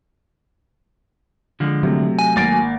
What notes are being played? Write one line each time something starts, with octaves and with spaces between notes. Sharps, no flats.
D3 F3 G#3
C3 F#3 A3
G#5
G#1 A#3 A6 D7